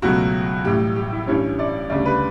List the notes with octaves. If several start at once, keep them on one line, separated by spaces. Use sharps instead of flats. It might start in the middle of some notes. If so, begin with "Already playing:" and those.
C#2 B2 F#3 A3 F#4
A1 A2 G3 G4
G4
E4
A1 G2 E3 G3 C#4 C#5
D5
D2 C#3 G3 D5
B4